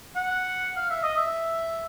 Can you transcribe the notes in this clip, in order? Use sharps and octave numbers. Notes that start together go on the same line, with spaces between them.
F#5
F5
E5
D#5
E5